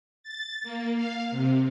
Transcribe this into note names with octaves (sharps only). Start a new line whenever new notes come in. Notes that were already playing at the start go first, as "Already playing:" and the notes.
A6
A#3
F5
C3